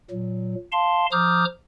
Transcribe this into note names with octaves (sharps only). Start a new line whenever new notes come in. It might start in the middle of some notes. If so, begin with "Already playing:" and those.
A#2 F#3
F5 A5 C6
F3 A#5 D6 D#6 F6 G6